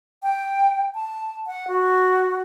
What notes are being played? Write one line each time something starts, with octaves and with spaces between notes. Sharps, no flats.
G5
A5
F#5
F#4